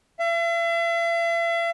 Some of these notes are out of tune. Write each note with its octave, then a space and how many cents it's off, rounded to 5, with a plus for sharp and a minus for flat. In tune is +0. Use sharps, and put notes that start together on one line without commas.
E5 +45